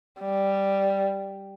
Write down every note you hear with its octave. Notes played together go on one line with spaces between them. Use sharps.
G3